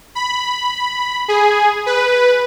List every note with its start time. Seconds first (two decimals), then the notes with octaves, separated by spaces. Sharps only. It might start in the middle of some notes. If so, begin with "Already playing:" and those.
0.15 B5
1.28 G#4
1.86 B4